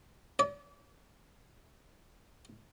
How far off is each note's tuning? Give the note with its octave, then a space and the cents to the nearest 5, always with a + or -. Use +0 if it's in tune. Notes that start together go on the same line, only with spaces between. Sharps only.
D5 -40